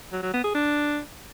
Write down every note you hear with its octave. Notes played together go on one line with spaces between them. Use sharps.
F#3
F#3
B3
G#4
D4